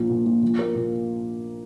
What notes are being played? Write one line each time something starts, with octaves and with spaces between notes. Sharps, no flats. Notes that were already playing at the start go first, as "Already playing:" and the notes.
Already playing: A#1 F3
A#2
A#1
F3
A#3
A#2